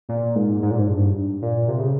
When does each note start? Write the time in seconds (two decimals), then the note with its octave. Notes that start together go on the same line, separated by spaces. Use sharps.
0.09 A#2
0.35 G#2
0.62 G#2
0.71 A#2
0.78 G#2
0.88 G2
1.42 A#2
1.68 C3
1.79 C#3